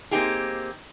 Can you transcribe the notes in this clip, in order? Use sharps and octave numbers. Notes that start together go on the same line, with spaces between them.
A#3 C4 D#4 G4 G#4